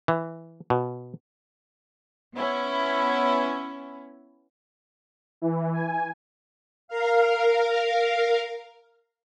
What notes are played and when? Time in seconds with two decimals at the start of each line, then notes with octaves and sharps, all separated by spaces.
0.08 E3
0.70 B2
2.34 B3 C#4 E4
5.42 E3
5.74 G#5
6.88 A#4 F5